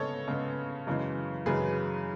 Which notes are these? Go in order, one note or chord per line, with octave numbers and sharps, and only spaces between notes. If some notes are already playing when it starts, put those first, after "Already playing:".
Already playing: C#3 G#3 B3 A4 C#5 D#5
C#3 G#3 B3
F#2 C#3 E3 G#3
F#2 C#3 E3 G#3 G#4 B4